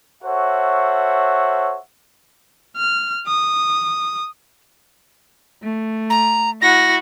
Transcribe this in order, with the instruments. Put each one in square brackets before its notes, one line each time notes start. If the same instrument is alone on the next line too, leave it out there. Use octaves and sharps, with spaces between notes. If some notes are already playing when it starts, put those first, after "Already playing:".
[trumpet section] F#4 A4 C5 C#5 E5 F#5
[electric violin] F6
D#6
[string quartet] A3
[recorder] A#5
[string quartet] E4 F#4 F#5 [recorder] A#6